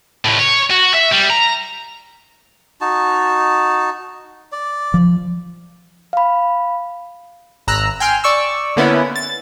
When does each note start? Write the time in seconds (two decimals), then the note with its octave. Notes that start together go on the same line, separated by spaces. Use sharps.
0.25 C#2 A2
0.39 C#5
0.71 F#4
0.95 E5
1.13 G3
1.30 A#5
2.81 D#4 F#4 A5
4.52 D5
4.94 F3
6.13 F5 B5
7.67 G#1 A#5 E6 F#6
8.00 G5 G#5 C6 F6
8.24 D5 C#6 E6
8.76 D3 A#3 B3 C#4 E4
9.16 A6